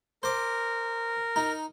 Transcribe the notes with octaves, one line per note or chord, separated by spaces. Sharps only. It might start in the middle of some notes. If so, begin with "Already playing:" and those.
A#4 C5 D6
D#4